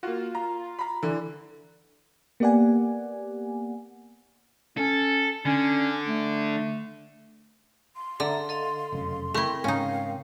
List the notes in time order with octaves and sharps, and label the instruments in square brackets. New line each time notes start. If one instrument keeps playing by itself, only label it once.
[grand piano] A#3 F#4 [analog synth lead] F4
[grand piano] A#5
A#5 B5
[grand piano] D3 [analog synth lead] E3
[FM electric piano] A#3 B3 G4 D5 F#5 G#5
[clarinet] C#4 [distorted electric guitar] A4
[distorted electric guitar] D3 [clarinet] C#4
[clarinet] A3
[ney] C6
[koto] D3 [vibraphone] A4 E5 A#5
[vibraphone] A4 D#5 F5
[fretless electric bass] F1 F#2 C#3
[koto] A3 E4 [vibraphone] C4 A#4 G5
[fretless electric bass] G#2 C#3 [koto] C#4 D#4 [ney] F5